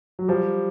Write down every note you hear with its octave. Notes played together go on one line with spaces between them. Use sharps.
F#3
F3 G3